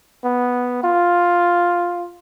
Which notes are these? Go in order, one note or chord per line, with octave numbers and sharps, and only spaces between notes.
B3
F4